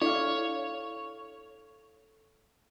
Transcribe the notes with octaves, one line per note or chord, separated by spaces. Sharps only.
D4 E4 A4 C#5 D5 F5